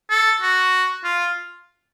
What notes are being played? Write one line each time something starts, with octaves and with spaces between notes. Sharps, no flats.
A4
F#4
F4